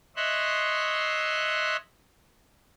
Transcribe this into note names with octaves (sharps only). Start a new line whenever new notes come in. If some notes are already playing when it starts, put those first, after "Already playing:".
C#5 D#5 E5 C6 F#6